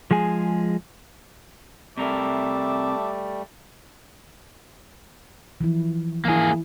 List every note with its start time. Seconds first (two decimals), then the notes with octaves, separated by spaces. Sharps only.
0.11 F3 G#3 G#4 G#5
1.97 C3 G3 A3 A#4 E5 A5 D6
5.60 E3 F3 E4
6.25 E3 A#3 E4 G#4